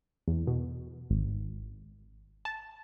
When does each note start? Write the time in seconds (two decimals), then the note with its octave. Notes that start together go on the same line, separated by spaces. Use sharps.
0.28 E2
0.47 B2
1.10 G#1
2.45 A5